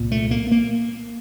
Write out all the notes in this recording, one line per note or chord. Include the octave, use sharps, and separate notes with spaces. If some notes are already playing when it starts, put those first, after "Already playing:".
Already playing: C2 A#2
A3
A#3
A#3